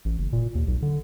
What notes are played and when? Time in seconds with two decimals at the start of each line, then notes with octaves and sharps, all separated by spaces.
0.05 A1
0.18 F#1
0.33 A#2
0.55 D#2
0.67 B1
0.82 D3